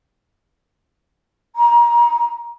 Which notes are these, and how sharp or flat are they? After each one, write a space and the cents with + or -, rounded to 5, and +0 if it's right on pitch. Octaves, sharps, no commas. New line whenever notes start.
A#5 +30